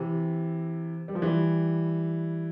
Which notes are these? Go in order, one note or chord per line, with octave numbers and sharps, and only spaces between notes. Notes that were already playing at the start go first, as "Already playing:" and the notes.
Already playing: C3 E3
G3
F3
E3 G3